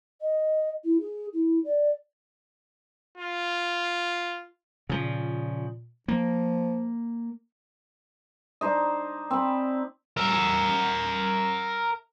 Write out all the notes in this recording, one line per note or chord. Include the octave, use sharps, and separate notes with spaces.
D#5
E4
G#4
E4
D5
F4
A#2 C#3 F3
F3 A#3
D4 D#4 C5 D#5
C4 B5
A#4 E5